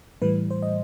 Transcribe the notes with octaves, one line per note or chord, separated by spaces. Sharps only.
A2 E3 G3 B4
C5
D#5